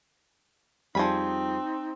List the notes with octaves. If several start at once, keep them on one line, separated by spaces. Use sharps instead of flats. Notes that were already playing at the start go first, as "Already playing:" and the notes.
F2 F3 G3 C4 D#4 G#4 B5